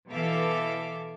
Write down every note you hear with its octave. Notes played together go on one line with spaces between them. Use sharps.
B2 E3 A4 E5 F5 D6